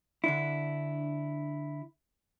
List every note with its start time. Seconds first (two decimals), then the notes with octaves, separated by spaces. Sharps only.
0.24 D3 D4 E4